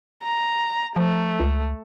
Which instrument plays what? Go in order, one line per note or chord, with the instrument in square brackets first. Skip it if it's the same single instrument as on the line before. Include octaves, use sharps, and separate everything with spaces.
[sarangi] A#5
[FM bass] F3 [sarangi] A3
[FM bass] C#2